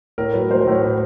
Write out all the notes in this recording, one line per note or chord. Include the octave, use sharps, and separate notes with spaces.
A2 A#4
F#3 B4
F#3 C5
C5
A2
C#5
A2 B4